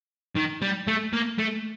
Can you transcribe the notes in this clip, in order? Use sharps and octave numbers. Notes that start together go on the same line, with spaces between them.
D#3
G3
A3
A#3
A3